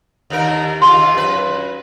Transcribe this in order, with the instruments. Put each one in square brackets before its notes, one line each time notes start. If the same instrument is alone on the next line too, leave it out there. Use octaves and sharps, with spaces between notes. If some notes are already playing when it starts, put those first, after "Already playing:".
[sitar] D#2 D#4 A#4
[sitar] D#2 G#3 F4 [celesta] C6
[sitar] F#2 B4